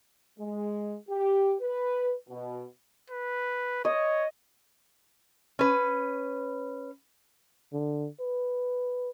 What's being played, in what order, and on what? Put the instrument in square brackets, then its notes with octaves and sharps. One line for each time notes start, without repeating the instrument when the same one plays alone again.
[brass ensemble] G#3
G4
B4
B2
[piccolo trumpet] B4
[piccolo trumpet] C#5 [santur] D#5
[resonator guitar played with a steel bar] C#4 B4
[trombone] D3
B4